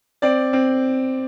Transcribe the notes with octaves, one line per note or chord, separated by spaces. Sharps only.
C4 D5
C4